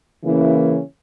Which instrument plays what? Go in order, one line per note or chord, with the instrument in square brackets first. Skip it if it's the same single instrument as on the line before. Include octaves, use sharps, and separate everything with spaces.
[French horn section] C#3 E3 A#3 C#4 E4